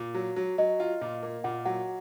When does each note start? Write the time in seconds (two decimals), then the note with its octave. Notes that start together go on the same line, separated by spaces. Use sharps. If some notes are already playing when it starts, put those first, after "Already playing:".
Already playing: A#2
0.14 F#3
0.36 F#3
0.58 F#3 D#5
0.80 F4
1.01 A#2
1.23 A#3
1.44 A#2 F#5
1.65 F#3 F#5